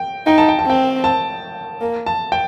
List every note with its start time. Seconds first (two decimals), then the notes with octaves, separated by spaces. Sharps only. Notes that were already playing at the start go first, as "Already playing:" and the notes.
Already playing: G5
0.26 D#4 G5
0.38 A5
0.48 G5
0.59 A5
0.66 C4 G5
1.04 A5
1.81 A#3
2.06 A5
2.32 G5